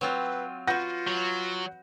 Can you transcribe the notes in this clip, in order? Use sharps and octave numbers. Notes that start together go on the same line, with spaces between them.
F#3 C4 F4 B4
F4 F#4 B4 F#5 G6 A#6
F#3